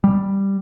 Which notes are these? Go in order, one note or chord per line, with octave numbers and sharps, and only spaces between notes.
G3